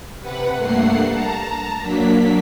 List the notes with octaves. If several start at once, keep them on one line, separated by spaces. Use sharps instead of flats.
C3 B4 F#5
G2 A3 A#3 F#5 C7
A5 A#5
F#3 A#3 D4 B6